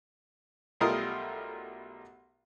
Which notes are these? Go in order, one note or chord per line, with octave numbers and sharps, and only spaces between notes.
B1 G3 A3 F4 A#4 D#5